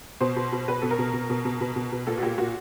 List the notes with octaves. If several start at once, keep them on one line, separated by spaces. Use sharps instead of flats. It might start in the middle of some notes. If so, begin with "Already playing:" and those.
B2 C5
B2
B2
B2 B4
B2 A4
A#4
B2
B2
B2
B2
B2
B2
B2
A#2 A4
F#4
A#2 G4
A#2 F#4